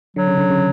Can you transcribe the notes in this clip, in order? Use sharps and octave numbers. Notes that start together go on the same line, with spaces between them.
D3 F#3
C#3
D3
C#3